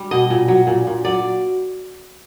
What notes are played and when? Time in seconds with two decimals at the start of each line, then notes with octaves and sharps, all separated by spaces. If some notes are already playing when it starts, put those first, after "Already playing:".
Already playing: G3
0.11 B2 D#5
0.30 A#2
0.48 F#3
0.67 A#2
0.87 A#2
1.05 F#3 D5